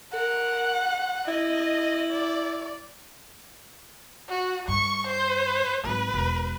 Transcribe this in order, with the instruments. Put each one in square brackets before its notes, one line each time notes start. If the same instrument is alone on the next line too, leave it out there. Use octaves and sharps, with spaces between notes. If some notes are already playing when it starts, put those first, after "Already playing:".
[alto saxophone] A#4 [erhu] F#5
[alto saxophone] E4 [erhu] D#5
[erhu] D5
F#4
[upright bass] G2 [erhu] C#6
[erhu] C5
[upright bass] G#1 F#3 [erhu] B4
[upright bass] E1